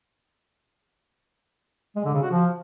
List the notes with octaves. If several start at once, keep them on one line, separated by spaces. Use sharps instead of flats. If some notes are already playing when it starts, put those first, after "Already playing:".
G#3
D3
C#3
F#4
F3